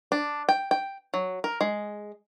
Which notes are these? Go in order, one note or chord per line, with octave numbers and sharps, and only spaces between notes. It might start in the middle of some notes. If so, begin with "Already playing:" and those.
D4
G5
G5
F#3
A#4
G#3